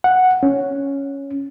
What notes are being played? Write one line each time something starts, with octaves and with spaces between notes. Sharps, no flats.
F#5
C#4